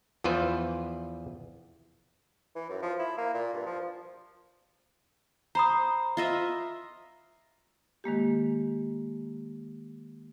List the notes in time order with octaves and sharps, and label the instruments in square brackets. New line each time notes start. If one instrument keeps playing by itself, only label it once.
[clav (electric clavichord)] E2 E3 F3 F4 B4 C5
[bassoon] E3
F#2
F3
E4
A#3
A#2
G2
F3
[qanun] C5 [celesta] A#5 B5 D#6
[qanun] F4 D#5 E5
[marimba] D#3 G#3 A#3 G4